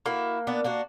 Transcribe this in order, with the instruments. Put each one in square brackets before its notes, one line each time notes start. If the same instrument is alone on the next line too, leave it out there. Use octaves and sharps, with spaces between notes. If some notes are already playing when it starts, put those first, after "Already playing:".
[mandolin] A#3 [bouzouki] E4 F#4
[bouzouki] B3 D4
A#3 D4 F#4